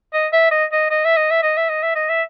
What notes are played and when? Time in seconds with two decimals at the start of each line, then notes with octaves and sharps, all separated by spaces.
0.13 D#5
0.33 E5
0.51 D#5
0.72 D#5
0.91 D#5
1.05 E5
1.16 D#5
1.30 E5
1.43 D#5
1.57 E5
1.69 D#5
1.82 E5
1.95 D#5
2.09 E5